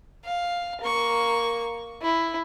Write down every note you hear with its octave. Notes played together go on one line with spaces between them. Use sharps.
F5
A#3 C#6
E4